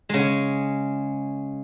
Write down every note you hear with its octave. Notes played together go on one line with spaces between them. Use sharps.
C#3 G#3